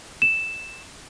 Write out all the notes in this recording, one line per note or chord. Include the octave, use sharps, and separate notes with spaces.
E7